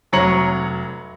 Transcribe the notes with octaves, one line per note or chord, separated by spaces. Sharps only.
F1 F#3 C#5 A#5 C#7 F#7